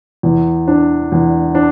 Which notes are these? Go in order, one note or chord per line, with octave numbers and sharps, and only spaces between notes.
E2
D4
E2
D4